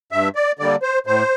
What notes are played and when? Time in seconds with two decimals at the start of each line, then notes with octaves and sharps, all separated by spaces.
0.12 G2 E5
0.35 D5
0.59 D3 G3 A#3 D5
0.82 C5
1.07 A2 C5